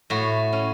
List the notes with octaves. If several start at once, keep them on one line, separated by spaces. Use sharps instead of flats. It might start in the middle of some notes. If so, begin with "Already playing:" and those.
A2 F#4
C#4